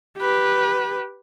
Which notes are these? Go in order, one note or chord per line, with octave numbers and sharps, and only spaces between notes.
G4 B4